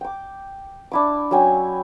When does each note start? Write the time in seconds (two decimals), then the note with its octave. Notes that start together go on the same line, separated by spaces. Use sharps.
0.01 G5 D6
0.91 D4 E4 D6
1.31 F#3 C#4 G5 G#5